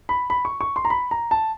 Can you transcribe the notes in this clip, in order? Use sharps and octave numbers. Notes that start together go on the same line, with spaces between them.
B5
B5
C#6
C#6
C6
A#5
B5
A#5
A5